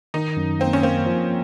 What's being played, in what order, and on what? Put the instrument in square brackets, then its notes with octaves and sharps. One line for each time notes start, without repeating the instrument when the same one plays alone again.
[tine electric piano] D#3 [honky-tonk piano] D#4
[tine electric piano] F#2
[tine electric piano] A#3 [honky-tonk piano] C4
[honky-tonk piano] C#4
[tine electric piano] A#3 [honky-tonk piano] C4
[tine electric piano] F3